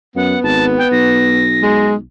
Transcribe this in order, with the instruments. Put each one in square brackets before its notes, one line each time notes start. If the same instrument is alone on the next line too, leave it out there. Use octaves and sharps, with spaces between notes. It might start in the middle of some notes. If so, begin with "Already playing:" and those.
[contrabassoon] F#2 [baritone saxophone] B3 [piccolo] F#5
[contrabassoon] G#1 [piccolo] A5
[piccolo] G5
[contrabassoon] B1 [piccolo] A#6
[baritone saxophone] G#3